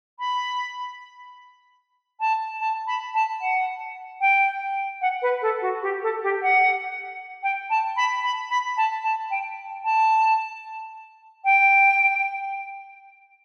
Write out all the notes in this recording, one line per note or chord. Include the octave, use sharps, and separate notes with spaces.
B5
A5
A5
B5
A5
F#5
G5
F#5
B4
A4
F#4
G4
A4
G4
F#5
G5
A5
B5
B5
B5
A5
A5
G5
A5
G5